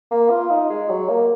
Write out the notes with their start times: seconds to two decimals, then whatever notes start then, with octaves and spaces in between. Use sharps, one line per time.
0.11 A#3
0.31 F4
0.50 D#4
0.70 G#3
0.89 F#3
1.09 A#3